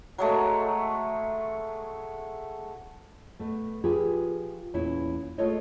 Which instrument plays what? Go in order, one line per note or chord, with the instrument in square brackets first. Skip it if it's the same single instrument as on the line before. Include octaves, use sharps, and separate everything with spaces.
[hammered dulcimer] F#3 G#3 A3
[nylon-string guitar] B2 A3
F3 F4 G4 G#4 B4
E2 A#2 C#4 E4
G#3 A3 F4 A4 C#5 D#5